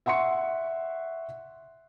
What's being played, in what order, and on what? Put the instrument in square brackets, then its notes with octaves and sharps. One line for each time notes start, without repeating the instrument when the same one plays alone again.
[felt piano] E5 F#5 C6 C#6 C#7